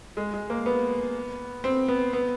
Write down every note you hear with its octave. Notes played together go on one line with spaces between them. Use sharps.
G#3
G#3
A#3
B3
C4
B3
B3